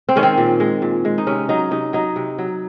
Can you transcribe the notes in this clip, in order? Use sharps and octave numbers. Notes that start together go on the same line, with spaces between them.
C4
D#3 G#3 C#4
C4
A#2
G#3
A#2
G#3
D#4
C3 C#4
F#3 D#4
C3 D#4
F#3 D#4
C3
F#3